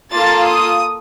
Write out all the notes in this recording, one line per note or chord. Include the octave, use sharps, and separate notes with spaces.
A#3 F4 A4 A6
D#6